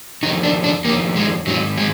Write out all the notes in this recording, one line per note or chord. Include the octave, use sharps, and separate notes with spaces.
F2 D#3 D#4
D4
D4
F2 D#3 A#3
G#3
G#2 D#3 F#3
G#3